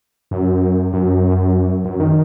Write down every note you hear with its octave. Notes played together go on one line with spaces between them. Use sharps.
F#2
F#2
F#2
D#3